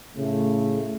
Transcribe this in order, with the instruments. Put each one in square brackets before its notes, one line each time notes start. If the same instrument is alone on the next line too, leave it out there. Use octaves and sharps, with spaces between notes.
[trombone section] A2 C#3 A3